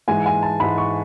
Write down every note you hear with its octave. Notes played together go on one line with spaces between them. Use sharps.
G#2 E3 G#3 G#5
G#5
A5
G#2 E3 G#3 B5
C#6